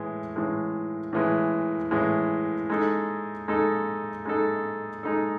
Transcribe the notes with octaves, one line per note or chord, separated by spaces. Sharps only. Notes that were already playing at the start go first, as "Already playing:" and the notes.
Already playing: A2 E3 G#3
A2 E3 G#3
A2 E3 G#3
A2 E3 G#3
G#3 D#4 A4
G#3 D#4 A4
G#3 D#4 A4
G#3 D#4 A4